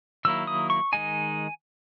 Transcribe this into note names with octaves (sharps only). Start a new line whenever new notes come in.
D#3 F#3 A#3 E4 E6
D#6
C#6
D#3 G#3 D#4 G#5